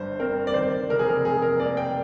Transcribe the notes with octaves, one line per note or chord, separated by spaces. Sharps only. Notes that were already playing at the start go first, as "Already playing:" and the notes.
Already playing: G1 G2 C5
C4 A#4
D5
D#3 C5
F1 A#4
G#4
A#4
F2 G#4
A#4
A#3 D5
G5